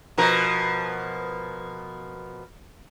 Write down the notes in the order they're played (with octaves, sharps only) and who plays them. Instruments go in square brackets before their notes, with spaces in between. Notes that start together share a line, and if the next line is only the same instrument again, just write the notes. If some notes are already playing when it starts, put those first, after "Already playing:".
[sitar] B2 F3 A#4